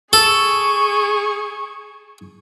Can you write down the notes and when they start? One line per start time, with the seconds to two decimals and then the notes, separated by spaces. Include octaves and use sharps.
0.13 G#4 A4 C#6